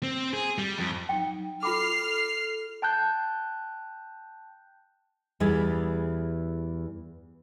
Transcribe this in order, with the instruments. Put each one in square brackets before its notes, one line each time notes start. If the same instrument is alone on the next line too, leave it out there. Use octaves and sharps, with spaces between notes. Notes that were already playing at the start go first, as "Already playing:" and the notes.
[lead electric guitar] C4
G#4
G3
F2
[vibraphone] F#3 D#4 [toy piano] G5
[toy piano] F4 B5 D6 [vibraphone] A4 [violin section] F6 C7
[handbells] G5 A5 F#6 G6
[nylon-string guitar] E2 E3 G3 G#4 D5